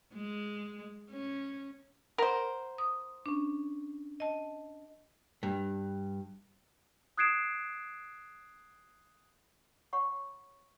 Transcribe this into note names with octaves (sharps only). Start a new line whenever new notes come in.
G#3
C#4
A#4 C5 F#5
D#6
C#4 D4
D#5 A5
G2
D#6 F#6 G#6 C7 D7 E7
C#5 F#5 B5 C#6